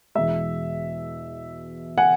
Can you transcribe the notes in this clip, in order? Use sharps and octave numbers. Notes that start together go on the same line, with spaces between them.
E2 B2 G#3 E5
F#5 G#5